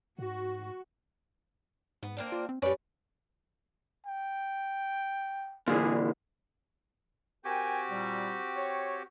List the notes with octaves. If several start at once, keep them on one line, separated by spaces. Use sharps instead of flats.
G#2 F#4
G#2 B3
A#3 C4 D4
F4
C4
F#2 G3 C#4 B4 D5
G5
A#2 D3 E3 G#4
C4 F#4 G4 A#4 G5 G#5
A#2 G3
C#5